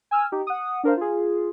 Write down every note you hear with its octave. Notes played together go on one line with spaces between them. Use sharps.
G#5 E6 F6
D#4 G4
F#5 D#6
D4 A#4 C5 F5
F4 G#4